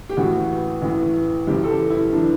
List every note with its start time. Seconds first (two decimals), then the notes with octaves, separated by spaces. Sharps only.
0.09 G4
0.17 A1 A2 E3 F#4
0.82 A1 A2 E3
1.47 F#1 F#2 E3 G4
1.64 A4
1.69 G4
1.90 E4
2.12 E3 D4